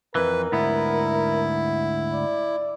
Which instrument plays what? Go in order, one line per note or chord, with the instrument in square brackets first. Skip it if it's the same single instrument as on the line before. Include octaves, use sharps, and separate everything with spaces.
[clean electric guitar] F2 E3 [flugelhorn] A#4 [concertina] B4
[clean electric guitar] D2 G#2 B3 [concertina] E4
[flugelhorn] D5